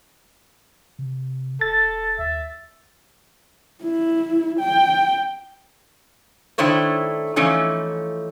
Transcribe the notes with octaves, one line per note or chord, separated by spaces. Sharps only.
C3
E1 A4 A6
D#2 E5
E4
G5
D#3 A3 D4 E4 C5 C#5
E3 F3 A3 C#4 D#4